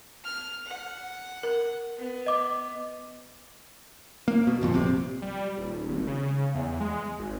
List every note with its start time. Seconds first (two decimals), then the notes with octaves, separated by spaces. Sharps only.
0.24 F6
0.66 F#5
1.43 A#4
1.97 B3
2.26 D#5 D6
4.28 A#3
4.47 B2
4.61 G1 F2 A#2
4.75 A#1 C3
5.22 G3
5.57 D#1
5.88 G#1
6.07 C#3
6.55 E2
6.80 G#3
7.19 G#1